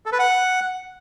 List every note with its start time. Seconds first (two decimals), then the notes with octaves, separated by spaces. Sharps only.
0.06 A4
0.12 B4
0.19 F#5